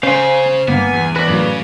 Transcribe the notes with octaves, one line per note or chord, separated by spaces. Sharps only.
C#3 C#4 C5 F5 G#5 C6
G1 A#3 B3 G#5
E2
F#4 B4 D5
F#2 A2 C#3 F#3